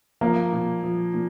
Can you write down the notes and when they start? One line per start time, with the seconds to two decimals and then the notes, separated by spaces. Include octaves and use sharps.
0.21 F3 A#3
0.52 A#2
0.83 F3
1.14 A#2